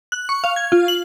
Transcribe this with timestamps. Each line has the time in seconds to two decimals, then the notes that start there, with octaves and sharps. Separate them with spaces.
0.12 F#6
0.29 C#6
0.44 F5
0.56 G#6
0.72 F4
0.88 F#7